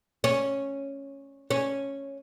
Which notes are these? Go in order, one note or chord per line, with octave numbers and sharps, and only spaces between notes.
C#4
C#4